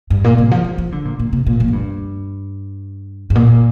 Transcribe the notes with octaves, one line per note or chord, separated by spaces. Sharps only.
G2
A#2
C3
F3
F3
F3
D3
A#2
A#2
C3
A#2
F2
A#2
G2
G2
A#2